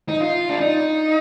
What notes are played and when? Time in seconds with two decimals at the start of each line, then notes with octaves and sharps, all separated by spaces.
0.09 D#4
0.20 F4
0.49 D4
0.60 D#4